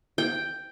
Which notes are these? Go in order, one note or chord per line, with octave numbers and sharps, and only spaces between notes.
G5